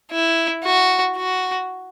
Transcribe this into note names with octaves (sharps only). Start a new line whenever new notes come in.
E4
F#4
F#4